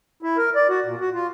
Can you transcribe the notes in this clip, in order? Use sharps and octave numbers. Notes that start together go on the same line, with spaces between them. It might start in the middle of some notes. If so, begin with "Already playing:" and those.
E4
A#4
D5
F#4
A#2
F#4
F4